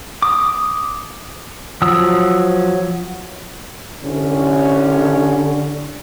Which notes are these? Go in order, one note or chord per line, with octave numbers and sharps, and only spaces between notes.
D6 D#6
F3 F#3 D#6 E6
C2 D3 C#4